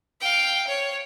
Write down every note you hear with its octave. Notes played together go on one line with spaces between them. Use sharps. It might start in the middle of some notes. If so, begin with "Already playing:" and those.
F5 G5
C#5